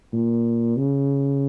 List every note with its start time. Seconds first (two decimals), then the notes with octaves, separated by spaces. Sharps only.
0.13 A#2
0.77 C#3